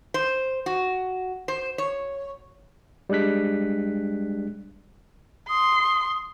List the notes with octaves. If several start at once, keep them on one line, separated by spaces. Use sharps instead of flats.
C5
F#4
C5
C#5
G3 G#3 D4 F#6 B6
C6 D#6